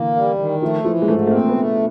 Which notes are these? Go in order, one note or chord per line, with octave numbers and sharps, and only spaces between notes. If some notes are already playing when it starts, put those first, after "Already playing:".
Already playing: D3 E3 A#3
G3
D#3
F3 A3
E3 F3
G#3
G#2 A3
A3
A#3 C4
B3
A3